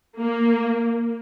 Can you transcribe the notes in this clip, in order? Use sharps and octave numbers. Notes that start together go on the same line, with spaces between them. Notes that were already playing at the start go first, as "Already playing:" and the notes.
A#3